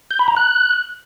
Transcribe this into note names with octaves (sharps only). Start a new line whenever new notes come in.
G6
B5
A#5
F#6